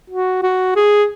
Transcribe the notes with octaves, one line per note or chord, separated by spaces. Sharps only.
F#4
F#4
G#4